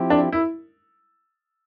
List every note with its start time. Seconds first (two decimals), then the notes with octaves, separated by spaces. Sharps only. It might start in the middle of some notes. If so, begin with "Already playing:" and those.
Already playing: F3 C4 E4 G4
0.10 D4
0.32 E4